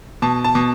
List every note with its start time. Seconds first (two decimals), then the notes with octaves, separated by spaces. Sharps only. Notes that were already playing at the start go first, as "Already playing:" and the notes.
0.22 B2 A5
0.44 A5
0.55 B2